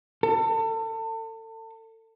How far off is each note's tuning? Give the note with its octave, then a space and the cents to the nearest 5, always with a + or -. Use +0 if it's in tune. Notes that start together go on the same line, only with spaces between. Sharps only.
A4 +35